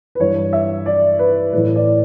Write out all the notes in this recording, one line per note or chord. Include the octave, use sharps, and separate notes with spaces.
B4
G2 E3 C#5
E5
D5
B4
A2 E3 B4
D5